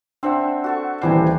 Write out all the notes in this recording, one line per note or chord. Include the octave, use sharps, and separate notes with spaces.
C4 D4 C5 E5 F#5
F#4 A4 C#6
D#1 E3 D4 G4 C5 G#5